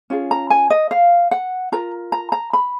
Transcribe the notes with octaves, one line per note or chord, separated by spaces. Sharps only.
C#4 F4 G#4
A#5
G#5
D#5
F5
F#5
F4 A#4 A#5
A#5
A#5
B5